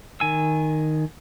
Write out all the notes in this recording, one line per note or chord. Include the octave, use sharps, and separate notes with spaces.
D#3 G#5 E6